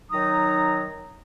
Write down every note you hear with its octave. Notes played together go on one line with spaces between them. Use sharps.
D#3 F#3 D#4 A#5 D#6